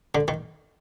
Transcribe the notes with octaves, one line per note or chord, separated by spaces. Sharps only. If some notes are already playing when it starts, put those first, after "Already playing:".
D3
D#3